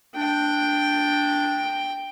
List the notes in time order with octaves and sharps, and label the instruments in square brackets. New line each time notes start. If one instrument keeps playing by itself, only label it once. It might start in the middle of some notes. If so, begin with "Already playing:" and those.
[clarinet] D4 [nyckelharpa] G5